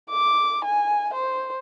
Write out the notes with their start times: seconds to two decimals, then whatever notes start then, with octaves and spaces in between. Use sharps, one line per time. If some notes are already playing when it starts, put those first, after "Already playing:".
0.10 D6
0.64 G#5
1.14 C5